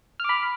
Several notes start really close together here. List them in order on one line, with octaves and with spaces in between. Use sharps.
F6 D6 B5